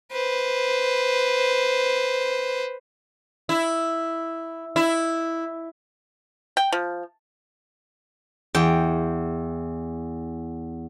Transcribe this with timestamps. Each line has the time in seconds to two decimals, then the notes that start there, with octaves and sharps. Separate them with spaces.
0.12 B4 C5
3.49 E4
4.76 E4
6.57 G5
6.72 F3
8.55 E2 G5